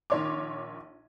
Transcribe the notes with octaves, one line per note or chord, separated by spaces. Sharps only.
A#1 D#3 C#5 C6 D6